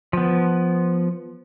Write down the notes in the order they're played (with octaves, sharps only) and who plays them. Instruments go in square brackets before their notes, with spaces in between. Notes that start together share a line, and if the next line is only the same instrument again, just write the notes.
[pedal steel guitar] F3 B3